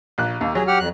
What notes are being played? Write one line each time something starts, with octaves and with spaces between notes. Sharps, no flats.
A#1 F#6
D#2 A#3
F#3 G#4
G4 F#5 F6
F2 F#6